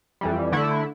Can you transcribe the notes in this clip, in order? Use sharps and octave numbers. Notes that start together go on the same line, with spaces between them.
F2 E3 G3
D3 A3 E4